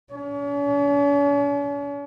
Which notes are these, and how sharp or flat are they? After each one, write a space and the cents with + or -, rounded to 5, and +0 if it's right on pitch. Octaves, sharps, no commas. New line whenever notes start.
C#4 +45